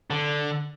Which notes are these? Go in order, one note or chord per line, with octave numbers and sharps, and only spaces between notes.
D3